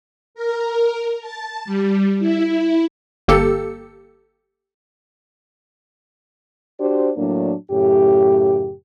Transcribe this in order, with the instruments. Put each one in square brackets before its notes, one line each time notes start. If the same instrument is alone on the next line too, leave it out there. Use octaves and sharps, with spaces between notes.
[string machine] A#4
A5
G3
E4
[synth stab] G1 A#3 G4 A4 E6 C#7
[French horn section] D4 F#4 G4 C5
A2 F#3 A#3 D4
F#2 A2 C#3 G4